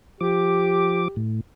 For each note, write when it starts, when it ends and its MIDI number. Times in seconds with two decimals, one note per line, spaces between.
0.21 1.08 53
0.21 1.20 67
0.21 1.08 86
1.16 1.40 45